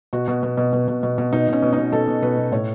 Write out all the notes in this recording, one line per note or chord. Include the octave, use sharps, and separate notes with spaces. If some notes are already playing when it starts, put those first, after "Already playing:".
B2 F#4
B2
B2
B2
B2
B2
B2
B2
B2 D#4
B2
C#4
B2
D#4
B2
B2 A4
B2
B2 B4
B2
A2 C#5